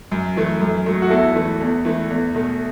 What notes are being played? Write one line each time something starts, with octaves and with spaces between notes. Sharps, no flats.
F#2
E3 A3
F#2
F#3 A3
F#4
E2 E4 A4
E3 A3
E2
E3 A3
E2
B2 A3